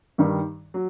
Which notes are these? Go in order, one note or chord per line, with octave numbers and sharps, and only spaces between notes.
G2 D#3 G3
F#3